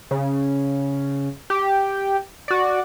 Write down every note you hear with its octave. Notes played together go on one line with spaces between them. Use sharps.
C#3
G4
F#4 D5